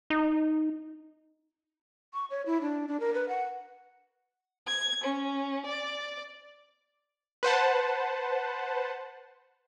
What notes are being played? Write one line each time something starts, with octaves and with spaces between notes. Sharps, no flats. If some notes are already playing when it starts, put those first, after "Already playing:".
D#4
C#6
C#5
E4
D4
D4
A#4
B4
F#5
G#6
C#4
D5
B4 C5 F#5 A5